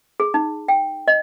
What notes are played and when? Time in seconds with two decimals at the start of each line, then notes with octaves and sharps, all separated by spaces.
0.20 G#4
0.34 D#4
0.68 G5
1.08 D#5